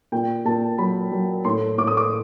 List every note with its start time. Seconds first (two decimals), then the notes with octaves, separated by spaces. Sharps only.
0.12 A#2 G5
0.45 A#2 A5
0.78 F#3 B5
1.12 F#3
1.45 A2 C6
1.78 A2 D6
1.87 D#6
1.97 D6